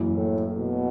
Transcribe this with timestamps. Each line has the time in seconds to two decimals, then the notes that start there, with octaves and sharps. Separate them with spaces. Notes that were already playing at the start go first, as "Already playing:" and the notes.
Already playing: F#1 F#2 E3
0.17 A2
0.59 B2